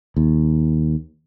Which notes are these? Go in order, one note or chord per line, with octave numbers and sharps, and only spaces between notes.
D#2